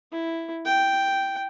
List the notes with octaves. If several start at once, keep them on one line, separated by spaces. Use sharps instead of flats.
E4
G5